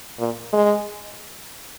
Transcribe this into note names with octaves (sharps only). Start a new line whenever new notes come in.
A#2
G#3